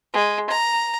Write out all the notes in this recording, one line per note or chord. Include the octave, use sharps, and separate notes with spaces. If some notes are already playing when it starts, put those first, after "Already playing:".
G#3
A#5